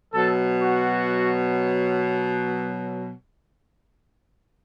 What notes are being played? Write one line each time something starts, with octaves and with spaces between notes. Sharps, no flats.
B2 F#3 A4
F#4